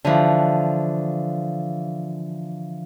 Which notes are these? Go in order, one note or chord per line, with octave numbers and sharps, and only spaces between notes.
D3 E3 F3